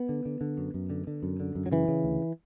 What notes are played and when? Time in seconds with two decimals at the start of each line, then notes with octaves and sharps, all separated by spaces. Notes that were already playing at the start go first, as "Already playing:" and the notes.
Already playing: B3
0.09 D3
0.25 D3
0.41 D3
0.58 F#2
0.74 F#2
0.90 D3
1.07 D3
1.23 F#2
1.40 D3
1.55 F#2
1.66 F#3
1.72 C#3 E3
1.88 C#3
2.04 D2